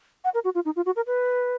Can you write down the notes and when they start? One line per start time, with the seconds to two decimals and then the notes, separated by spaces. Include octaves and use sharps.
0.24 F#5
0.34 A#4
0.44 F#4
0.55 F4
0.65 D#4
0.76 F4
0.86 F#4
0.96 A#4
1.07 B4